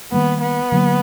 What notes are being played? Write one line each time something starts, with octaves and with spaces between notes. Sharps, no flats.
D#3 G3 A#3 B3
B3
D3 F#3 A#3